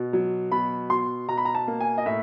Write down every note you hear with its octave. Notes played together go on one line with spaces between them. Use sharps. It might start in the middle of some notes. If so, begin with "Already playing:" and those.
Already playing: B2
F#3
B2 B5
B2 C6
B2 A#5
B5
A#5
A5
A#3
G#5
D#5
A2 E5